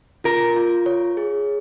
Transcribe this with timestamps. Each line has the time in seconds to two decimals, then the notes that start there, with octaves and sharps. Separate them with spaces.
0.24 F4 A#4
0.56 F4
0.86 C#5
1.17 G#4